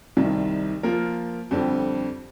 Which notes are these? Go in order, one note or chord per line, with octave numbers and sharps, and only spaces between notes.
C2 C3 D#3 G3
F3 A#3 F4 A#4
F2 D3 G3 C4 G4